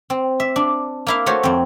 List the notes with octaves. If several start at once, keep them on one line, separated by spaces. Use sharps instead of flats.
C4
E5
D4
A#3 E4 F5
A3 F#4 C5 C#5
F2 C4